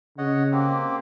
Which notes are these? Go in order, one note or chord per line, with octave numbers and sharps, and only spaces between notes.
C#3 C#5 D#5 F#5
A#3 C4 G4